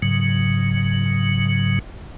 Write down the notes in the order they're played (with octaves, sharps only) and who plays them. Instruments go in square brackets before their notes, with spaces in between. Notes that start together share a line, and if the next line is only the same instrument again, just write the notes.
[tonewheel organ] G#2 C#3 F#3